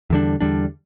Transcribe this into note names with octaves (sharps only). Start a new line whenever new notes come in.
E2 D3 G3 D4
E2 D3 G3 D4